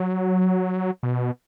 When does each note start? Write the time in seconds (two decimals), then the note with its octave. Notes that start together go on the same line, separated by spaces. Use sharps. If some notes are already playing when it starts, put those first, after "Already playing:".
Already playing: F#3
1.03 B2